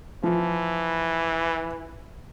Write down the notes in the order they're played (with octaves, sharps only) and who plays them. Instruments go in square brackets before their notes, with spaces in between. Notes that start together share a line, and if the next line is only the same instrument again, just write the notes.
[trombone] E3 [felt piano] F3